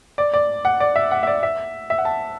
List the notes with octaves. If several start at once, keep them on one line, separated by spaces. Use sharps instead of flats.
D5
D5
F#5
D5
E5
F#5
E5
D5
E5
E5
F#5
A5